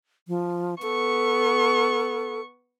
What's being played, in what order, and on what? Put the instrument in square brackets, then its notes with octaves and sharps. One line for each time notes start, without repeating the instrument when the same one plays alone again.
[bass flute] F3
[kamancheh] B3 C#6 [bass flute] A4